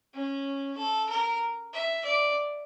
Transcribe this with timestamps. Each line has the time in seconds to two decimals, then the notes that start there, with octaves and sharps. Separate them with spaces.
0.14 C#4
0.77 A4
1.09 A#4
1.73 E5
2.05 D5